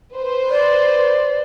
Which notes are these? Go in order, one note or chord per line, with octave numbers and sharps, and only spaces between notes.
B4 C5
D5